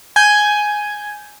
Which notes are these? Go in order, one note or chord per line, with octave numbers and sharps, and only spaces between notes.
G#5 G6